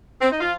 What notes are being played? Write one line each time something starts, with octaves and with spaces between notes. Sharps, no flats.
C4
D#4
F3 F4